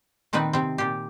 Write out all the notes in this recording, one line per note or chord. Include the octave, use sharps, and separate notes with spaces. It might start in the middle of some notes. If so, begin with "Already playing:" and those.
A#2 D#3 C4 D#4 B4
C3 C4
A#2 G4